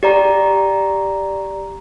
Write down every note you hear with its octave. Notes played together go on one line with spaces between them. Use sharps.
G4 D5 A#5